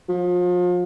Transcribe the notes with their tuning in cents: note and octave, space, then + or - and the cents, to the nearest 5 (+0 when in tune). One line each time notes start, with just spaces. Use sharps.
F3 +35